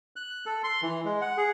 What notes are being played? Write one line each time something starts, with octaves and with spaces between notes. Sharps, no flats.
F#6
A4
C6
E3
G#3
F#5
G#4